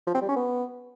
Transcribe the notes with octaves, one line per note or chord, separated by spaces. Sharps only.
F3
C4
G3
C#4
B3